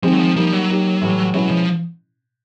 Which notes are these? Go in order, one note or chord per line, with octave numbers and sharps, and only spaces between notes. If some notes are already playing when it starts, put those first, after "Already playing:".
D#3 F3 G#3 C4
F#3
F3
F3 G3 A#3 D#4
F#3
A#3 D#4 G4
A2 E3 G3
B2 F#3 G#3 C#4 E4
F3